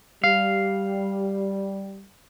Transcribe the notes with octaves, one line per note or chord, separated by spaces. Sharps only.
G3 F5